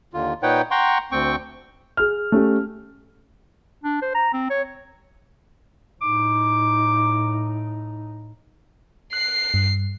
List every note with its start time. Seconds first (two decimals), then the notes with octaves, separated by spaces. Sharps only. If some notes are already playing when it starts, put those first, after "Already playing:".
0.14 D#2 D3 F4
0.43 A#2 D#4 B4 C#5 F#5 G5
0.71 F#5 G5 A#5 C6 C#6
1.12 D2 C4 G5 C#6
1.97 G#4 F6
2.32 A3 C#4 G4
3.84 D4
4.02 C5
4.15 A#5
4.33 C4
4.51 C#5
6.01 A2 D#4 D6
9.13 F#6 C7
9.54 G2